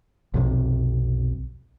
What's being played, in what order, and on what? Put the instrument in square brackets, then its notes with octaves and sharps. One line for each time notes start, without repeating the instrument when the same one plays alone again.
[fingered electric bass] B1 F2 C3